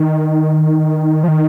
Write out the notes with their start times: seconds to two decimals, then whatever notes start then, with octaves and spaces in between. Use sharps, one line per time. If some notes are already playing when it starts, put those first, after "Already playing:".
Already playing: D#3
1.24 F3
1.28 D#3